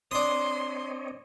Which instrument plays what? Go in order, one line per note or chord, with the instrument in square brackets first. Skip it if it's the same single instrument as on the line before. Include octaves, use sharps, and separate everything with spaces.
[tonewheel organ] C4 C#5 D#5 [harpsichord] D4 D#6 [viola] C6